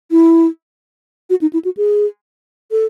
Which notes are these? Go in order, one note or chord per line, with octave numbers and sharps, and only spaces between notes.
E4
F#4
D#4
E4
F#4
G#4
A4